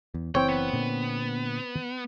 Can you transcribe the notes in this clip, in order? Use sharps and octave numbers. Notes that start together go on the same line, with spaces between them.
E2
F#1 E3 C4 C#5 G5
B3
A#2 D3